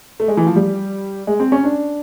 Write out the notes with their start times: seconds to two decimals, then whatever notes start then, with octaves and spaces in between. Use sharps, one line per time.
0.20 A3
0.28 G#3
0.37 E3
0.46 F3
0.56 G3
1.27 G#3
1.40 C4
1.52 C#4
1.64 D4